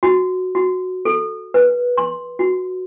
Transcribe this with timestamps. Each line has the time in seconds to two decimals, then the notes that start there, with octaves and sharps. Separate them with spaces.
0.03 F#4
0.55 F#4
1.05 A4
1.54 B4
1.98 C6
2.39 F#4